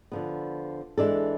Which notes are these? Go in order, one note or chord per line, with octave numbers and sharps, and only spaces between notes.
D3 F3 B3
E3 G#3 D4 A4